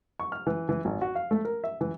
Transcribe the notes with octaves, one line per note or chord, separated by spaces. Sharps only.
C#6
F6
E3
E3
G#1
F#4
F5
A3
A#4
E5
E3